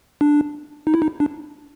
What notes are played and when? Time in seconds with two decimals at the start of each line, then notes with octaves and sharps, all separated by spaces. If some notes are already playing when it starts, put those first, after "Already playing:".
0.21 D4
0.87 D#4
0.94 E4
1.02 D#4
1.20 D4